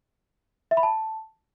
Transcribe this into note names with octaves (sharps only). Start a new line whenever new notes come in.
E5
B5
A5